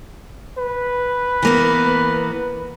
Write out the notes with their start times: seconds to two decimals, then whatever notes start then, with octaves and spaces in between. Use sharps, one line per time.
0.58 B4
1.42 E3 A#3 B3